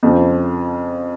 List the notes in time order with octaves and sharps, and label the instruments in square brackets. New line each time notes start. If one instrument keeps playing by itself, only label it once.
[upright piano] F2 C#3 F3